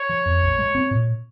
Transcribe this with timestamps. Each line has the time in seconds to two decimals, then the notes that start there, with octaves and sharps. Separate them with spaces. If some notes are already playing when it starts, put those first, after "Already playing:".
Already playing: C#5
0.09 F3
0.26 F2
0.42 A#1
0.59 G#3
0.75 C4
0.91 A#2